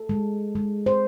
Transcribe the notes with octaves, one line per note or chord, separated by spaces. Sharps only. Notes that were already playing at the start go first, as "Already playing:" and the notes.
Already playing: A4
G#3
G#3
C5